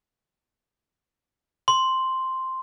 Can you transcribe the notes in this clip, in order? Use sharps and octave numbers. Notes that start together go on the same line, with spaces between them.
C6